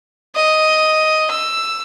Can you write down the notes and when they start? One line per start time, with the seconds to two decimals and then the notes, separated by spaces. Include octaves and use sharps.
0.36 D#5
1.31 E6